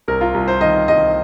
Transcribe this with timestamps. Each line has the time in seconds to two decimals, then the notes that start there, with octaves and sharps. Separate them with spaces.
0.08 C2 A#4
0.21 F4
0.34 C2
0.48 C5
0.61 D#3 D#5
0.88 C2 D#5